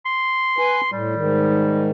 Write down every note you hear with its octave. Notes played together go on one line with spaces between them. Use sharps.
C6
B4 G#5
A2 G3
G#2 D#3